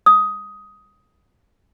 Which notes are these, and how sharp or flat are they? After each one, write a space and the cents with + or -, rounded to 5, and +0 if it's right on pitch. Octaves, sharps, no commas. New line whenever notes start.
D#6 +10